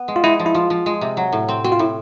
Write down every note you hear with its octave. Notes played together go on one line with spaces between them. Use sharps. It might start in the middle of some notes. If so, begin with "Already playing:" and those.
Already playing: B3
G#3
F4
G#3 E4
F3
E4
F3 F4
F3
G#3
C3
F#3
A2
C4
C4 F#4
F4
A2 E4